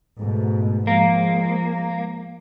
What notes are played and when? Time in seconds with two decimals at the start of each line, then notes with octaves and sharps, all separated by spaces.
0.18 G#2 B2 A3
0.87 F3 G#3 A#3